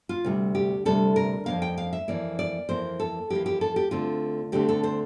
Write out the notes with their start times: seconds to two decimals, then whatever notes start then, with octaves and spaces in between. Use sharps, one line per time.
0.09 F4
0.25 D2 C3 G3
0.55 G4
0.85 D2 C3 G3 A4
1.16 A#4
1.46 F2 E3 A#3 F5
1.62 G5
1.78 F5
1.93 E5
2.08 F2 E3 A#3 D5
2.39 D5
2.69 F2 E3 A#3 C5
3.00 A4
3.30 F2 E3 A#3 G4
3.46 G4
3.61 A4
3.76 G4
3.91 D2 D3 A3 C4 F4
4.52 D2 D3 A3 C4 G4
4.69 A4
4.83 C5